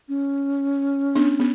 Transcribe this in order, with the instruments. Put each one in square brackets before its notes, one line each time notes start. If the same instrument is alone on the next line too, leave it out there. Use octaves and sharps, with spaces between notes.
[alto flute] C#4
[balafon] B3 D4
B3